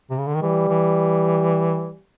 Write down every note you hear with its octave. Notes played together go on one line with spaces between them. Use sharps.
C3
C#3
D3
D#3
E3 G3
E3